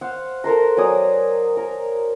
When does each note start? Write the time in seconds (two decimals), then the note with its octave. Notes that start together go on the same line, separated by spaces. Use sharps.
0.01 C5 F5 F#5
0.44 A4 A#4 C5 A#5
0.77 F#3 D5 G#5 D#6
1.57 A#4